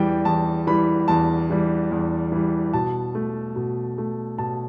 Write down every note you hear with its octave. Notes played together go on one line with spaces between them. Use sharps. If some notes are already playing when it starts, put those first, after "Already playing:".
Already playing: E2 E3 G3 G5
E2 A5
E3 G3 B5
E2 A5
E3 G3
E2
E3 G3
B2 A5
A3
B2
A3
B2 A5